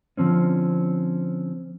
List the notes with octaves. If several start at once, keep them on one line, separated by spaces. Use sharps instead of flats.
D3 F3 C4 C#4